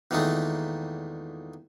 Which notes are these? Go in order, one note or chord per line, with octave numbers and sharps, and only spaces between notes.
E2 A#2 D#3 G#3 A3